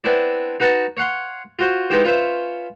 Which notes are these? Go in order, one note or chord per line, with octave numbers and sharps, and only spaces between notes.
B3 C4 D4 E4 D5
D#4 F#4 B4 F#5 A5
C#5 F5 F#5 C6
F4 F#4 C5
G#3 B3 D#4 E4 G4 C5
C#4 F4 B4 C5 E5